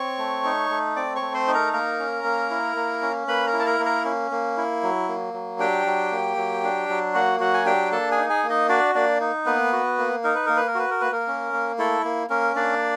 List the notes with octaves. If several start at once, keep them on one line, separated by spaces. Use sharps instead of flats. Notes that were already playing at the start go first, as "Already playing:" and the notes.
Already playing: C4 C#5 C#6
A3
D#4
A3
C4 D5 D6
C#5 C#6
A3
C5 C6
D#4
A#4 A#5
A#3 A#4 A#5
C#4
A#3
E4
A#3
C#4
A#3 B4 B5
A#4 A#5
E4
A5
A#4 A#5
A#3
A#4 A#5
C#4
A#3
E4
F#3
A#3
F#3
D4 G4 G5
F#3
A#3
F#3
D4
F#3
A#3 F#4 F#5
F#3 F#4 F#5
G#5
D4 G4 G5
A#3 A4 A5
G#4 G#5
D#4
G#4 G#5
A#3
D#4 D#5
D4 F#4 D5
A#3 D4 D5
D#4
A#3 B3 B4
F#4
A#3
D#4 A#4
B4
A#3 A#4
B4
A#4
F#4 B4
A#4
A#3 B4
A#3 A#4
C#4
A#3
A3 E4 A4
A#3
A#3 C#4 A#4
A#3 D4 D5